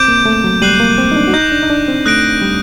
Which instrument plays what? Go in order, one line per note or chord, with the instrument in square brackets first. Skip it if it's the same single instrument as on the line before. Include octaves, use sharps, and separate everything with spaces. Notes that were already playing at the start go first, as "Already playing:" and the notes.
Already playing: [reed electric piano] C4 [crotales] D6 G6 D7
[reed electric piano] A#3
A3
F#3
[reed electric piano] G3 [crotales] F#6 C7 D#7 F#7
[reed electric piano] A#3
C4
D#4
D4
F#4
[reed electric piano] D#4 [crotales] D6 G6 A#6
[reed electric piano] D4
D#4
D4
C4
[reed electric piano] A3 [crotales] D#6 F#6 A#6 D7
[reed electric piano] G3